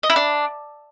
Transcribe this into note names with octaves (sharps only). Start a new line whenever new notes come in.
D#5
E4
D4